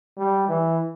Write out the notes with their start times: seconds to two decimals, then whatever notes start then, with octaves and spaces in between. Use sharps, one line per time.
0.18 G3
0.49 E3